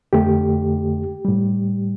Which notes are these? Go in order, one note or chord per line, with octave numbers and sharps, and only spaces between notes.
F2 D3 A3 G4
A2 G3